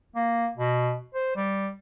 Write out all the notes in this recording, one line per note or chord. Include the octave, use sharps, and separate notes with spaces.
A#3
B2
C5
G3